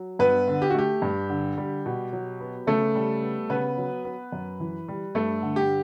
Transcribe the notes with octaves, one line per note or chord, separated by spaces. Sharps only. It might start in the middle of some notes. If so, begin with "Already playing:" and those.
Already playing: F#3
G2 B3 B4
D3
G4
F#4
A3 G4
G2
D3
G3
B2
F#3
B3
C#3 A3 A4
G3
B3
C#3 B3 B4
F#3
B3
F#2
E3
G3
G2 A3 A4
D3
G4